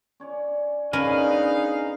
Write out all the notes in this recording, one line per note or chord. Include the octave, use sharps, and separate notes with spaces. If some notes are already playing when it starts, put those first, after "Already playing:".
C#4 C#5 D5
D3 B3 C#4 D#4 G#4 A#4 B4 F5